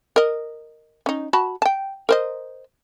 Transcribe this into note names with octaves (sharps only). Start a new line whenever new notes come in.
A#4 D#5
C#4 D#4
F#4 A5 B5
G5 A5
A#4 C5 D#5